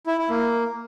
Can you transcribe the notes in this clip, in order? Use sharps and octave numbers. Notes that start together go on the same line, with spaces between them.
E4
E4
A#3